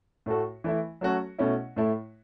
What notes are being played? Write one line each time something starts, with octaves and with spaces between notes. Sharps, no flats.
A2 A3 F#4 A4
E3 A3 E4
F#3 A3 C#4 F#4 A4
B2 A3 C#4 E4
A2 A3 E4